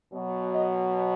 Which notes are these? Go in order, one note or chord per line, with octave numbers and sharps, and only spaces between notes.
B2 F#3
D#5